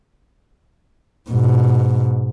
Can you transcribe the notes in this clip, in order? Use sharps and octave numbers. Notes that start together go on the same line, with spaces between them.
G#2 B2